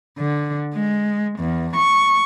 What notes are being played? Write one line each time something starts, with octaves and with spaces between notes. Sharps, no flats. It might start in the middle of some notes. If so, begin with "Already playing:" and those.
D3
G#3
E2
C#6